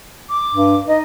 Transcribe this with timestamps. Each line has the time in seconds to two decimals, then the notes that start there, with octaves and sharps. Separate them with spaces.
0.29 D6
0.53 G2
0.87 D#4 D#5